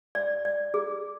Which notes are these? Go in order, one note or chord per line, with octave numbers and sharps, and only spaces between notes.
D5
D5
G#4